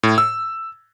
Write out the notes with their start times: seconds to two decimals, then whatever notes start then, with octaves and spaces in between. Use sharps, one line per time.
0.03 A2
0.18 E6